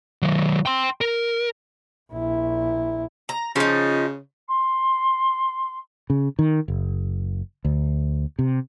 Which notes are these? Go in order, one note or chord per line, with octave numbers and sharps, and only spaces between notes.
D#3 F#3
G5 C6
A#4
A#1 E4
A#5
C#3 F3 D#4
C6
C#3
D#3
F#1
D2
C3